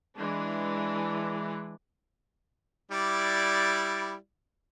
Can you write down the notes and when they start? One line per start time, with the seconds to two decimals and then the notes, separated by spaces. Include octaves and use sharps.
0.15 E3 G#3 D4
2.91 G3 E4 D5